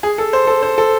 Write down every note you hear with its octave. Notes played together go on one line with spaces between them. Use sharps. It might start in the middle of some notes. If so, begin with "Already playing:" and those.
G#4
A4
C5
A4
C5
A4